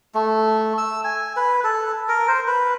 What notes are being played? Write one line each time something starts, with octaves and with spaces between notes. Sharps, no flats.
A3
E6
G#5
B4
A4
A#4
C5
B4